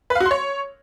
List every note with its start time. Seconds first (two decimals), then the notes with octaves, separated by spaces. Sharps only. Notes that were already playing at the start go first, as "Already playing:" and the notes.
0.10 B4
0.15 F5
0.20 F#4
0.26 C6
0.31 C#5